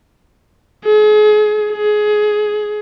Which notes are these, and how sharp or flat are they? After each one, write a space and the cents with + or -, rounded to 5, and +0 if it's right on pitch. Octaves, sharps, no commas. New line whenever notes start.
G#4 +35
G#4 +20